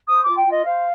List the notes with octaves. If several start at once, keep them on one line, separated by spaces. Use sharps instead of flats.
C5 D#6
D6
F4
G5
F4
D#5
C5 F5